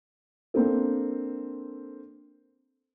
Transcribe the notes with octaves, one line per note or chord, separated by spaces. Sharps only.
A#3 C4 D4 A4